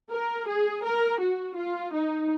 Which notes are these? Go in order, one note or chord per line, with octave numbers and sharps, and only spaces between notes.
A#4
G#4
A#4
F#4
F4
D#4